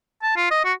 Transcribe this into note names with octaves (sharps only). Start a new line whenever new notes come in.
A5
F4
D#5
F#4